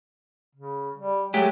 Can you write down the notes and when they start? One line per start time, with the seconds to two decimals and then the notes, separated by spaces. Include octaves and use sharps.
0.55 C#3
0.98 G3
1.34 F#3 G#3 A3 G4